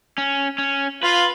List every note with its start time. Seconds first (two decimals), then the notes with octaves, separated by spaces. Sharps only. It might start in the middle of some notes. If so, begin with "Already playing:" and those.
0.18 C#4
0.58 C#4
1.03 F4 B4 F5